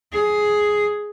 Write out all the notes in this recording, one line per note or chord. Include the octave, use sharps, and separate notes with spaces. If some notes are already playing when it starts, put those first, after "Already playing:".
G#4